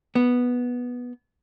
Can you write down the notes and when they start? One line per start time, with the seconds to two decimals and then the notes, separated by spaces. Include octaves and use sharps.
0.15 B3